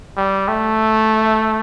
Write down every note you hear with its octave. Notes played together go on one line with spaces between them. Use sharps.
G3
A3